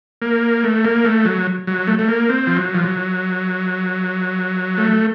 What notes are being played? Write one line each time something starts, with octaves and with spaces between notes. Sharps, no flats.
A#3
A3
A#3
A3
F#3
F#3
A3
A3
A#3
C4
F3
F#3
F3
F#3
A3